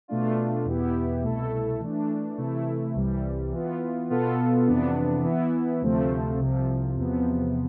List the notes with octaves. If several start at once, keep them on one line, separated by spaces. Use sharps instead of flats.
B2 A3 D4 F4
E2 B2 B3 E4 G4
C2 B2 A3 E4 A4
E3 A3 D4
C3 E3 A3 E4
C2 C3 E3 G3
E3 B3 F4
B2 B3 F4 A4
F2 C3 E3 B3 D4
E3 B3 E4
D2 C3 F3 A3 C4
C2 C3 F3
E2 C3 F3 B3